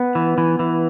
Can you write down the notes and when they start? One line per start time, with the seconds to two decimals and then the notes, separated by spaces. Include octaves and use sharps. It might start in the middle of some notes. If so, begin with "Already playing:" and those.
Already playing: B3
0.15 E3
0.38 E3
0.59 E3